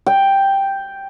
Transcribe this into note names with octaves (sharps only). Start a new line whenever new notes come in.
G5